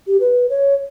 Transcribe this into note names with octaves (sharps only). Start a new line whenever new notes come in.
G4
B4
C#5